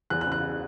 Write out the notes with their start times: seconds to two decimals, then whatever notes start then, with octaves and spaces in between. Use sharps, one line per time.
0.10 E2 F#6
0.21 F#6
0.26 C#3
0.32 F#6